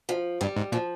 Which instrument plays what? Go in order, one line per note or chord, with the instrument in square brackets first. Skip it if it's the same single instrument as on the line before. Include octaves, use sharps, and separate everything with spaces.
[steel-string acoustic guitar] F3
[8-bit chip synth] G2 [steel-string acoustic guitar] G3
[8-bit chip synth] G#2
[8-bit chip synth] A#2 [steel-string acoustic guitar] F3